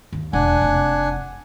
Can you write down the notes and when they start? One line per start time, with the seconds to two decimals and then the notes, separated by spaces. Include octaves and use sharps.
0.13 D#2
0.33 E1 D4 F#5 G#5
0.62 F1